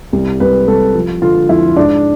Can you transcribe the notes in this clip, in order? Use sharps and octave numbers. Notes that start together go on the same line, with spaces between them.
C2
C2 B4
C2 A4
F3
D3 F4
F2 E4
G#2 D4